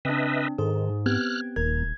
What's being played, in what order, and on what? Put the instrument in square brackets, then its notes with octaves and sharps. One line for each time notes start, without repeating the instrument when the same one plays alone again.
[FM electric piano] C#3 [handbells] C4 D4 [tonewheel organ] B4 D#5 E5
[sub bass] G#2 [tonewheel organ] D#3 [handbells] G#4 [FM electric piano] A4 C5
[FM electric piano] B3 C4 G4 [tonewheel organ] F6 F#6 [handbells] G#6
[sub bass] D#1 [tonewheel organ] D#2 [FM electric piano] A#4 [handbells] G#6